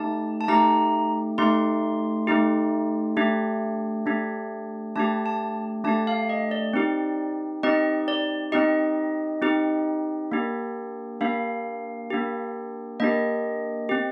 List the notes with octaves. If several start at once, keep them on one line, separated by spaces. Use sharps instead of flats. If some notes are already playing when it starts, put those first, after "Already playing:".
Already playing: A3 D#4 G4 A5
A5
A3 D#4 G4 A#5
A3 D#4 G4 C6
A3 D#4 G4
A3 D4 G4
A3 D4 G4
A3 D4 G4 A5
A5
A3 D4 G4 A5
F5
D#5
D5
C4 D#4 G4
C4 D#4 G4 D#5
D5
C4 D#4 G4 D#5
C4 D#4 G4
A#3 D4 G4
A#3 D4 G4 F5
A#3 D4 G4
A#3 D4 G4 D#5
C4 G4